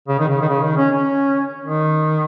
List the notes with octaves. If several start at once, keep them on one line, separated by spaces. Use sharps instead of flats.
C#3
D#3
C#3
D#3
C#3
D#3
C#4
C#4
D#3